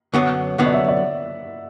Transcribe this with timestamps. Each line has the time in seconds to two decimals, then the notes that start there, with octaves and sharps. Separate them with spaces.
0.14 F#2 D3 F#3 B3
0.58 F#2 D3 F#3 B3 F#5
0.66 D5
0.74 E5
0.88 D5